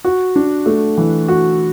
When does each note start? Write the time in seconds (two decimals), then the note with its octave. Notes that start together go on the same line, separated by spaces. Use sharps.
0.04 F#4
0.36 D4
0.66 A3
0.98 E3
1.28 F#4